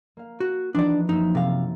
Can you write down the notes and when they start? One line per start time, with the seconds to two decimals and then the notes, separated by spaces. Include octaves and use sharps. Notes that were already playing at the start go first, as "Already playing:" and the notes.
0.17 A#3 F5
0.40 F#4
0.75 E3 F3 D4 D#4 D5
1.09 F#2 A#3 D#4 E5
1.35 C3 A4 A#4 F5